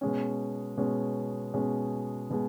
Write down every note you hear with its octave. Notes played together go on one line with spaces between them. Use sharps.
B2 G#3 C#4
B2 G#3 C#4
B2 G#3 C#4
B2 G#3